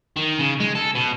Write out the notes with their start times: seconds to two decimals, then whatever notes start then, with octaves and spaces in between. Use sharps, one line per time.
0.16 D#3
0.39 C#3
0.60 G#3
0.75 A4
0.95 B2